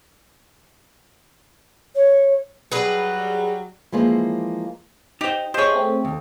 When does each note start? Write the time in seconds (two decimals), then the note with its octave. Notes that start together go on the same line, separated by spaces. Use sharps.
1.95 C#5
2.72 F#3 G3 G#4 B4
3.92 E3 F3 G#3 A#3 C5
5.21 D#4 G4 C5
5.54 G4 G#4 C5 C#5 D#5 C6
5.72 A3 C4
6.05 D#2